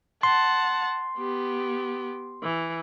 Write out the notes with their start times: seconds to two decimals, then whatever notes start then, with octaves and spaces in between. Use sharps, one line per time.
0.23 F#5 A5 C6
1.18 B3 G4
2.43 E3